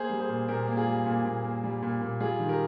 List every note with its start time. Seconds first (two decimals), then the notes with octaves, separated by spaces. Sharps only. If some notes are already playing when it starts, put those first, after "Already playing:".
Already playing: A#3 G#4 C5
0.10 G3
0.20 G#4 C5
0.29 A#2
0.48 A#2 G4 A#4
0.68 A#3
0.77 F4 G#4
0.87 G3
1.06 A#2
1.25 A#2
1.44 A#3
1.64 G3
1.82 A#2
2.02 A#2
2.20 G3 F4 G#4
2.40 D#3
2.49 G4 A#4